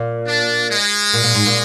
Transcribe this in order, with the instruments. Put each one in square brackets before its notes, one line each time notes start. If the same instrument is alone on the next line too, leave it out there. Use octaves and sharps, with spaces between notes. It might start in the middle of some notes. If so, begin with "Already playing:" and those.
Already playing: [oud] A#2
[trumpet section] D4
G#3
[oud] A#2
A#2
G#2
A#2